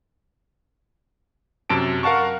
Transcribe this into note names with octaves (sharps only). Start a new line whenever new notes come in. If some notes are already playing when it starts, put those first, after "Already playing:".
F#2 C3 A5 D7
A#4 F5 F#5 A5 C#6